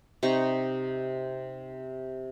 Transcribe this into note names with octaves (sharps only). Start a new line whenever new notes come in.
C3 D#4 C#6